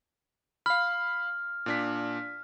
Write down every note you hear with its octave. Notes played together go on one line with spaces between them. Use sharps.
F5 B5 F6
A#2 D4 B6